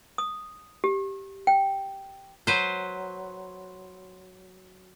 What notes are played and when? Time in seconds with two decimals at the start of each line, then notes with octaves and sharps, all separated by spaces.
0.18 D#6
0.84 G4
1.47 G5
2.47 F#3 B4 C5